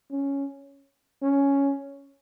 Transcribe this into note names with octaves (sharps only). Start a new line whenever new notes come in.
C#4
C#4